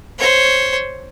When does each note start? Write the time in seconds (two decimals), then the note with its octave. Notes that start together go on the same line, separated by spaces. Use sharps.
0.19 C5 C#5